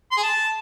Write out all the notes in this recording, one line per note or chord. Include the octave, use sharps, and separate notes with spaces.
C6
G#4
A5